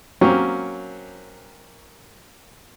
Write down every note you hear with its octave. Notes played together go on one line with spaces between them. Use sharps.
F#3 A#3 C4 C#4 G4